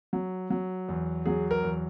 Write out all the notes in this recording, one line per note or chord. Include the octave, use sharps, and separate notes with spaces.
F#3
F#3
E2
F#3 G#4
A#4
E2